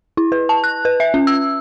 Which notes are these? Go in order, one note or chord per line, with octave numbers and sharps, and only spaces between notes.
E4
B4
A5
F#6
B4
E5
C#4
E6